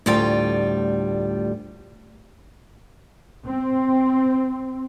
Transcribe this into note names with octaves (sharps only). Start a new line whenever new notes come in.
D2 A2 G3 F4 G5
C4